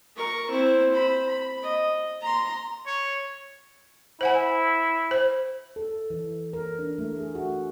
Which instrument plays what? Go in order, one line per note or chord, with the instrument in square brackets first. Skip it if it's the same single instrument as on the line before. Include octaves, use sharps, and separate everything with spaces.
[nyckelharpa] A#4 C#6
C4 E4
C5 B5
B5
D#5
A#5 C6
[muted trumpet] C#5
[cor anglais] E4 [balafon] C5 F#5 G#5
[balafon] C5
[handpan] A4
E3
A#4
D4
A3
G#4
F#4